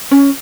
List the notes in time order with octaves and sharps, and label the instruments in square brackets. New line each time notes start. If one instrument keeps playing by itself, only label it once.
[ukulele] C#4